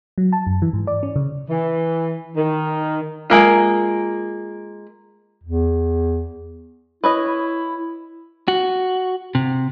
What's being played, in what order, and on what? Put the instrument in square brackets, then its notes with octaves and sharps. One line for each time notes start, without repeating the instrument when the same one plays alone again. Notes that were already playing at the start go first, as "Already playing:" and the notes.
[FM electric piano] F#3
A5
F#2
E3
G#2
D5
C#4
C#3
[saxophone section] E3
D#3
[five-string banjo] G#3 A#3 F4
[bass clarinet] E2
[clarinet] E4 [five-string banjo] B4 C#5 D#5
[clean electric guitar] F#4
C3